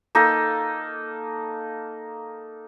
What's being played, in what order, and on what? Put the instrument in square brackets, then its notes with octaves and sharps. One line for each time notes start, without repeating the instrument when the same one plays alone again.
[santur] A#3 D#4 A4